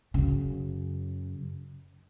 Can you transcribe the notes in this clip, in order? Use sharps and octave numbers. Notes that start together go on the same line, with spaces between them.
F#2 C#3